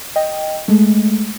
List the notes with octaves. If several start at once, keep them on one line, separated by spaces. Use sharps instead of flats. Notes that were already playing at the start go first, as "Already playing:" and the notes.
D#5 G5
G#3 A3